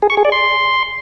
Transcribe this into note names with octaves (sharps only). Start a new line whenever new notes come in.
G#4
C#6
G#4
D5
C6